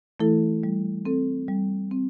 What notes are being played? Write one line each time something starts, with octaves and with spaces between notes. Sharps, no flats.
E3 A3 E4 A4
G3
C4 A4
G3
C4